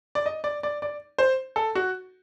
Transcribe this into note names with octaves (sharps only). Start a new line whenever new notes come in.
D5
D#5
D5
D5
D5
C5
A4
F#4